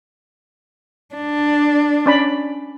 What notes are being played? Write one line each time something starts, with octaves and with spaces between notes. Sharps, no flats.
D4
C#4 D5 B5